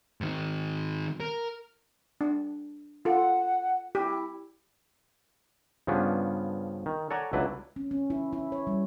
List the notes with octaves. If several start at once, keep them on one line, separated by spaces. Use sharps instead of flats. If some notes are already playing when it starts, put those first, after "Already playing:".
G#2 D#3
A#4
D4
F4 A4 F#5
E4 G4
G2 C#3 F3 B3 C#4 D4
D#3
A4 C#5 D5 F#5 G#5 A#5
C#2 F#3 D4 E4 B4
C#4
C#4
E4
E4
C#5
G3